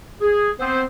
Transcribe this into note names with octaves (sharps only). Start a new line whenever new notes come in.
G#4
B3 C4 C5